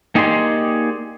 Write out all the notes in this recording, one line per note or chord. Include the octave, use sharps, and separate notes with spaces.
A#3 D#4 G4 G#4 D5 C6